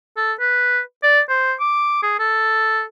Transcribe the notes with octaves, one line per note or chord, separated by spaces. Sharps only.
A4
B4
D5
C5
D6
G#4
A4